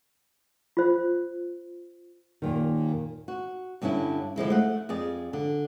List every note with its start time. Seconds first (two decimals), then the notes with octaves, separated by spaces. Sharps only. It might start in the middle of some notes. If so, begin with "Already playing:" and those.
0.77 F4 C5
2.42 D#2 A#2 D#3
3.28 F#4
3.82 G2 D3 C#4 D4 E4
4.36 D3 F3 G#3 E4
4.50 A3 F#5
4.89 F2 G#4 D5
5.33 D3